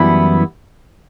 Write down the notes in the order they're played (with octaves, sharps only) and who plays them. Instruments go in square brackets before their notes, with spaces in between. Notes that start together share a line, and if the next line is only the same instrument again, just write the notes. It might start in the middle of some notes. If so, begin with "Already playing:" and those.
Already playing: [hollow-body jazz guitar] F#2 E3 G3 B3 E4